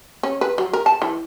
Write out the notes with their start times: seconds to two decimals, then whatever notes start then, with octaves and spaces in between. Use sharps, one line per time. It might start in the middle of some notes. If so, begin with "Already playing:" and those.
0.23 C#4
0.41 B4
0.58 F#3
0.73 A#4
0.86 A5
1.02 E3